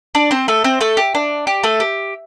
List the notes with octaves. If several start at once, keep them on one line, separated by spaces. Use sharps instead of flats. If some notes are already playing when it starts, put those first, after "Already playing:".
D4 D5
C4 C5
A3 A4
C4 C5
A3 A4
G4
D4
G4
A3 A4
G4